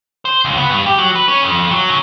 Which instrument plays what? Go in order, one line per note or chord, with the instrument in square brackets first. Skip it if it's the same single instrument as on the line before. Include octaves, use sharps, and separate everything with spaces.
[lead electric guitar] C5
C#2
B3
G2
G4
F#3
B4
C#4
F2
F#3
C#3